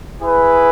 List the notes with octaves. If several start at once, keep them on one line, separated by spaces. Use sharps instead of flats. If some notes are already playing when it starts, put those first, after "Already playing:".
E4 G#4 B4